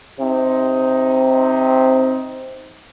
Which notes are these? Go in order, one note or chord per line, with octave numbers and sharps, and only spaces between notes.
C3 C4 D#4